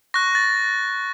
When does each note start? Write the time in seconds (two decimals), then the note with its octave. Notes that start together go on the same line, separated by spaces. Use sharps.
0.14 C#6 F#6 A#6
0.35 A6